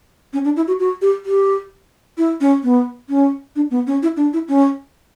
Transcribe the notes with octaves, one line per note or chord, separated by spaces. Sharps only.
C#4
D4
E4
F#4
F#4
G4
G4
E4
C#4
B3
C#4
D4
B3
C#4
E4
D4
E4
C#4